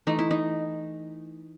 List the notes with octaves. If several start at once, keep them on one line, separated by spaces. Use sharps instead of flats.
E3 A3 D#4
E4
D#4